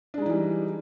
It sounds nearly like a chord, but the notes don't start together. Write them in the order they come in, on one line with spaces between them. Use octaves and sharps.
D4 G#3 D#4 E3 G3